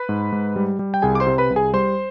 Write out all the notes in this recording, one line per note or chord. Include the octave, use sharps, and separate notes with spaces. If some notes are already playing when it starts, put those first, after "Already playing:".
Already playing: B4 B5
G#2
G#2
G3
G3
G5
C2 G#4 G#5
D6
C5 C6
C3
B4 B5
C2
G#4 G#5
G3 C5 C6